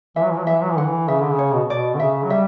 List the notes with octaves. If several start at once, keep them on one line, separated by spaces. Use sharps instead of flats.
E3 E5
F#3
E3
F#3
E3 E5
F#3
E3
D3 F#5
E3
C#3 E5
D3
C#3
C#5
B2
B2 D5
D3
C#3 E5
F#3
G3 E5